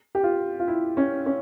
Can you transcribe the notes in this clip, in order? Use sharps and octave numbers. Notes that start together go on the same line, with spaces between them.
G4
F4
F4
E4
C#4
C#4